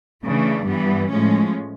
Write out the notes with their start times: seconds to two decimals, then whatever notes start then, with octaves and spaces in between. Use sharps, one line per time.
0.25 C#3 E3 A3 D4
0.67 G2 E3 G3 B3
1.09 A2 F3 G#3 C#4